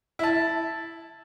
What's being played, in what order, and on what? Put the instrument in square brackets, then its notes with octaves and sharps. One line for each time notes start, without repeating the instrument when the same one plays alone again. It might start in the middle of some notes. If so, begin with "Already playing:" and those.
[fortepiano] E4 A5